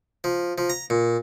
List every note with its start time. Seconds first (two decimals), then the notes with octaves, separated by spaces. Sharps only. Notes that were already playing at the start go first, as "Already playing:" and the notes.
0.24 F3
0.58 F3
0.70 A#5
0.90 A#2